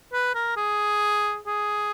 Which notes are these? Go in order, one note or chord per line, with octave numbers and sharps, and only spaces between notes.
B4
A#4
G#4
G#4